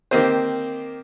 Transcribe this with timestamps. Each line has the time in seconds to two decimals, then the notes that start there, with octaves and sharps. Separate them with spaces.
0.11 D#3 A#3 C4 G4 C5